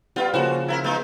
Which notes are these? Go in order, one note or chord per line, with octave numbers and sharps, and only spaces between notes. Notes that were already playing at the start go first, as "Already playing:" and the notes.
G3 B3 F4 B4 G5
C#3 F3 A#3 F#4
E4 A4 A#4
F3 G#3 B3 D#4